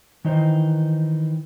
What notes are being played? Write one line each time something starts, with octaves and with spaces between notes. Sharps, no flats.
D#3 E3 D#4 C5